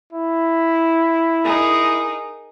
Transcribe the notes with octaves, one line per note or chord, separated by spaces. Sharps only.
E4
D#4 G#4 A#4